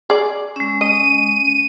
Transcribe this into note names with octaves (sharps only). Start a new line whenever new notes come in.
G#4 D5
G#3 C#4
D#5 D#7